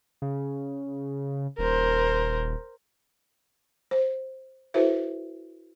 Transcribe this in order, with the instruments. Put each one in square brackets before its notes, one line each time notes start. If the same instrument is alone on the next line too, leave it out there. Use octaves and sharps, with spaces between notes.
[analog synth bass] C#3
[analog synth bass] D#1 [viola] A#4 C5
[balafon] C5
E4 F#4 A4 B4 C5 E5